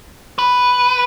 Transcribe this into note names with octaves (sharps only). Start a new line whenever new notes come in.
B4